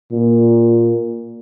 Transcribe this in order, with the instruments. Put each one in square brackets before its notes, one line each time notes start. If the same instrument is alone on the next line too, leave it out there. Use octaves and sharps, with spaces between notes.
[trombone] A#2